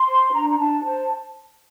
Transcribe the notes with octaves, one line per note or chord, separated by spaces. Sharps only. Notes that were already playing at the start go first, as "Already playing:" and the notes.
Already playing: C6
C5
D4 A#5
A#5
D4 A5
C5 A5